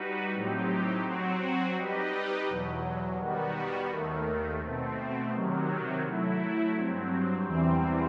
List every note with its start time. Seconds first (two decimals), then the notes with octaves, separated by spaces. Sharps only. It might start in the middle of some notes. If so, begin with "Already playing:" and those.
Already playing: G3 D#4 F#4 B4
0.34 A2 F#3 C4 D#4 G4
1.05 F#3 C4 F#4
1.76 G3 D#4 G4 B4 D#5
2.48 E2 B2 F#3
3.20 D#3 G3 B3 F#4
3.91 D#2 D#3 A3
4.62 B2 A3 C4
5.33 C3 D#3 F#3
6.05 F#3 A3 E4
6.76 G2 F#3 C4
7.48 E2 C3 E3 G3 C4